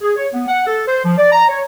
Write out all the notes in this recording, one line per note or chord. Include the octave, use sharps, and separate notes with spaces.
G#4
C#5
B3
F#5
A4
C5
F3
D5
A#5
C#5